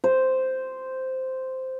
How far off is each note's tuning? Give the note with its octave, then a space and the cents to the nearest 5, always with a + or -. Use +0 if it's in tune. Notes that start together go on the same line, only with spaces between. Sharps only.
C5 -5